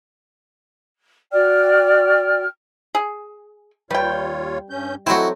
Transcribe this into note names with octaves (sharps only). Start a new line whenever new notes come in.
F#4 D5 G5 F6
G#4
D#2 G3 F4 B4 C#5 G5
G2 C#4 G6
F#3 A3 C4 E4 F#4 D#5